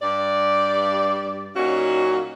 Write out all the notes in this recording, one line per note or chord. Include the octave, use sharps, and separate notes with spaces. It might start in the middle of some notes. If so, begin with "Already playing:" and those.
G2 D5
A#2 F#3 C#4 D#4 F4 F#4